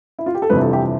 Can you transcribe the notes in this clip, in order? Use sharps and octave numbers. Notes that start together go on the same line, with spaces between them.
E4
F4
G4
A4
G1 F2 C3 E3 B4
A4
G4